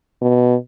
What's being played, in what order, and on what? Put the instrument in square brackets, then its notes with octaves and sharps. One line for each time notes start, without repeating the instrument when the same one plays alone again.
[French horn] B2